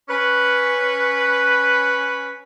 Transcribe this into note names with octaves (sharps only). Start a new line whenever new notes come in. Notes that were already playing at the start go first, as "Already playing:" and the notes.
C#4 B4